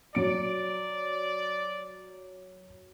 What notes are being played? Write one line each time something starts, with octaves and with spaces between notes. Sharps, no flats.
F#3 D5 D7